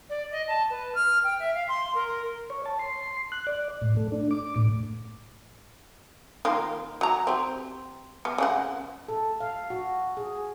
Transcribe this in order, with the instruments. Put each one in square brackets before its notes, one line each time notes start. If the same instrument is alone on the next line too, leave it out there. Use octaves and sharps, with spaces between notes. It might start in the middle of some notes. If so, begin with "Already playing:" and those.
[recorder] D5
D#5
A5
B4
F6
G5
E5
F5
C6
A#4
[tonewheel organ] C#5
A5
C6
F#6
D5
A2
A3
D4
D6
A2
[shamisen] D#3 A#3 F4
F#3 A#5
C4 G4
G3 B3
C#3 G#3 F#5
[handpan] A4
F5
F#4
G#4